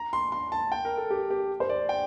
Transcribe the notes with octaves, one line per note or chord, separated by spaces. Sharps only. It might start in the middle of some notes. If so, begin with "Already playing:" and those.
Already playing: A#5
C6
C6
A5
G5
A#4
A4
G4
G4
C5
D5
G5